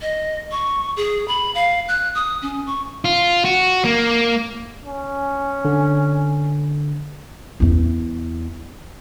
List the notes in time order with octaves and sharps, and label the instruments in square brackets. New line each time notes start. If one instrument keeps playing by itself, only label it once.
[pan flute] D#5
C#6
G#4
B5
F5
F#6
D#6
C#4
C#6
[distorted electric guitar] F4
F#4
A#3
[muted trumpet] C#4
[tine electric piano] D3
[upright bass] E2 E4